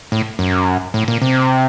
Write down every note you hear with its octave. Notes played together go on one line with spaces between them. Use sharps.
A2
F#2
A2
A#2
C3